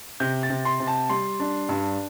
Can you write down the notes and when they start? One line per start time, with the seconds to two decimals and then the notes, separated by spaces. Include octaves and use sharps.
0.20 C3 G6
0.43 A6
0.50 C3
0.65 C6
0.80 C3
0.87 A5
1.09 G3 C6
1.40 D4
1.69 G2